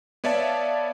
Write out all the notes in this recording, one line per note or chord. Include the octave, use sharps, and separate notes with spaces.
B3 C#5 D5 E5 F5 A5